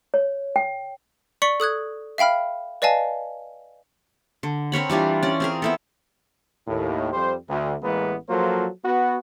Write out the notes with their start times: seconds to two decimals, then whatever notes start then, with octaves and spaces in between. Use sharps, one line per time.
0.14 C#5
0.56 G5
1.42 D5 C#6 B6 C#7 F#7 G7
1.60 A4 D#6 F#6 G#6
2.18 E5 F5 G5 B5 F6
2.82 B4 D5 D#5 F5 G#5 A5
4.43 D3
4.72 C4 A#4 C#5 B5
4.90 E3 G3 D4 F4
5.23 C#4 D5
5.40 C4 G#4 A#4
5.62 B3 E4 A4
6.68 D#2 A2
7.12 F2 G3 C5
7.49 D2
7.83 A1 E3 G#3 A#3 B3
8.29 F3 F#3 A#3 F4 A4 C5
8.85 B3 F#4